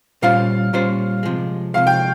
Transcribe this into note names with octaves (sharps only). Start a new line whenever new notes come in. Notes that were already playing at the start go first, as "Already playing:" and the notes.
A#2 G3 C#4 F4 C5 F5
A#2 G3 C#4 F4 C5
C3 F3 G#3
C3 F3 G#3 F5
G5